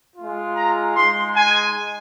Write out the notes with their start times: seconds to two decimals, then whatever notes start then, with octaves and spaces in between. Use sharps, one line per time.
0.16 G#3 F4
0.56 A#5
0.94 G#3 D#4 C6
1.35 G#5